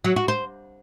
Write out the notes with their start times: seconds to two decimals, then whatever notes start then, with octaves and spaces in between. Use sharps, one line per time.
0.04 F#3
0.16 F#4
0.28 C5